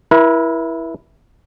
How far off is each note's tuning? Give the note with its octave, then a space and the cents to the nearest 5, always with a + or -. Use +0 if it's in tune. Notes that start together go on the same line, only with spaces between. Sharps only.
E4 +0 A#4 +45